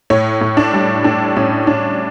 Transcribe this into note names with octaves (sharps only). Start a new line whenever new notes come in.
A2 C#5
A2
D4
G3
A2 D4
A2 C#4
A2 D4